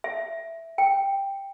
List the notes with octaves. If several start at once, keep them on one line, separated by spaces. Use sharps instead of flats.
E5
G5